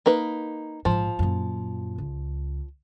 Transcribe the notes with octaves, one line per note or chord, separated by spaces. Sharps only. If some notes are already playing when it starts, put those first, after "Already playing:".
A#3 D#4 B4
A#1 G#2 F3
F#2 A#2
C#2